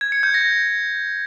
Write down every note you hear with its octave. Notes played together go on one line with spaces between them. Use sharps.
G#6
C#7
G6
A#6